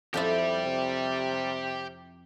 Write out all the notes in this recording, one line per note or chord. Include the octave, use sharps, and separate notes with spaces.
F2 C4 E4 G4 D5
C3